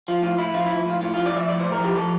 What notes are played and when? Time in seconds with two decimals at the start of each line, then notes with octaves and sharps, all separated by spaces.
0.08 F3 F4
0.22 A2 F4
0.38 A2 E4
0.54 F3 F4
0.66 F3 E4
0.86 A2 F4
1.01 A2 F4
1.14 F3 F4
1.26 D5
1.33 F3 E5
1.49 A2 D5
1.60 A2 C5
1.72 A#4
1.80 F3 G4
1.95 F3 A4